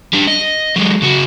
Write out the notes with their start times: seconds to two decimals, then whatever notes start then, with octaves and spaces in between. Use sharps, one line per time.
0.13 G3 D4
0.27 D#5
0.76 F#3 G#3
1.02 C#3 F#4